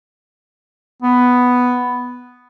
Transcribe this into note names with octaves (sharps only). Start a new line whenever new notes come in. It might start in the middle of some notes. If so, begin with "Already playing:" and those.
B3